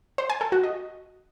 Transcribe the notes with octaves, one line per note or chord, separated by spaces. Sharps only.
C5
G#5
A4
F#4
D#5